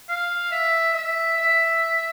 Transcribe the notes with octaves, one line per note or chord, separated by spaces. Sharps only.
F5
E5
E5
E5